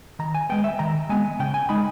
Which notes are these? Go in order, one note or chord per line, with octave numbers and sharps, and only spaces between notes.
D#3 A#5
G#5
G#3 B3 G5
E5
D#3 A#5
G#3 B3 G#5
C#3 G5
G#5
G#3 D#4 B5